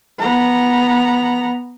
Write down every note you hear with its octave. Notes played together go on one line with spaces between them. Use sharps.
B3 A#5